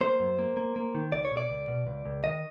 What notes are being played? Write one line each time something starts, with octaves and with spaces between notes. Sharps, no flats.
A#3 C5
F#2
A#3
A#3
A#3
D#3
C#2 D5
C#5
B2 D5
C#2
B2
C#2
C#2
D#3 D#5